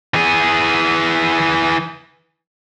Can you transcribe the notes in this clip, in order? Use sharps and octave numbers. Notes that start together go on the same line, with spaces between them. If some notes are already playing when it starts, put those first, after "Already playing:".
E3 G#4